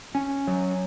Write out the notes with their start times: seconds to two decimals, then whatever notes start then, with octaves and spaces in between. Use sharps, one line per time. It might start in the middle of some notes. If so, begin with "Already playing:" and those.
0.15 C#4
0.47 F#3